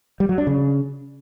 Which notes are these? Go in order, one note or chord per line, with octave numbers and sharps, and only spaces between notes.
G3
F#3
D4
C#3